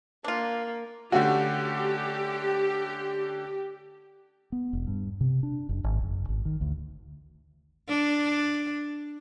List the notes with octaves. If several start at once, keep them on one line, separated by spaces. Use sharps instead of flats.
A#3 D4 F4
D3 A3 C#4 F#4 G4
B3
E1
G2
C3
D4
F#1
G#1
F#1
G#1
D#3
D2
D4